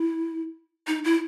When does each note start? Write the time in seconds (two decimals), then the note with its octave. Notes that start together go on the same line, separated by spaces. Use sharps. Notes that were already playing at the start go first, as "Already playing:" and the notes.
Already playing: E4
0.87 D#4
1.04 E4